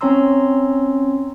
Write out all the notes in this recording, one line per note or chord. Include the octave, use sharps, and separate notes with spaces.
C4 C#4 C#5 A#5 C6 E6